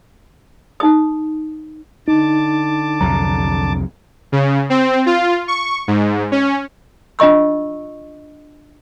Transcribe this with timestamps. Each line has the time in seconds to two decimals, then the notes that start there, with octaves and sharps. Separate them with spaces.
0.80 D#4 D#6
2.08 D3 D#4 A5 D6
3.01 C2 F2 F#3 A#5
4.32 C#3
4.70 C4
5.06 F4
5.48 C#6
5.88 G#2
6.32 C#4
7.19 D4 F4 D#5 C#6 E6